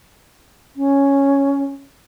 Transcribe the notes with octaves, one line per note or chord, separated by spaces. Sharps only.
C#4